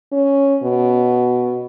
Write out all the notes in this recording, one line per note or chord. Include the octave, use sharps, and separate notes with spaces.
C#4
B2